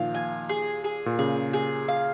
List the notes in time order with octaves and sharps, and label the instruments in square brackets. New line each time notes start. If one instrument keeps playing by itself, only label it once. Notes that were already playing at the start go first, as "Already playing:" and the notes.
Already playing: [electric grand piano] A#2 D#3 F3 [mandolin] F5
[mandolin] G#5
G#4
G#4
[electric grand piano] A#2
[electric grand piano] C#3 [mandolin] G#4
[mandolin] G#4
F5